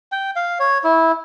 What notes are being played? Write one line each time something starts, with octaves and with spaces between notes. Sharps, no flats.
G5
F5
C#5
E4